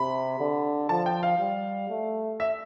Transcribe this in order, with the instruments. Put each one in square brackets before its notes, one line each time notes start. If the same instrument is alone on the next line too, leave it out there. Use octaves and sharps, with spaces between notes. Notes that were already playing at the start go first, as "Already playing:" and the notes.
Already playing: [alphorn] C3 [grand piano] B5
[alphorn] D3
[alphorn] F3 [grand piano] A5
[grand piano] G5
F5
[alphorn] G3
A3
[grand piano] E5